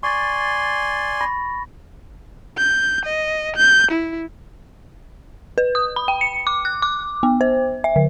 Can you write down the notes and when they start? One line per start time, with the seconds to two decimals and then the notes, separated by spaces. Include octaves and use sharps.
0.03 D5 G#5 C6 C#6 A6
1.21 B5 A#6
2.58 G6
3.05 D#5
3.56 G6
3.91 E4
5.58 B4
5.75 D#6
5.96 B5
6.08 G5
6.21 C#7
6.47 D6
6.65 F#6
6.82 D6
7.23 B3
7.41 C5
7.84 E5
7.96 D3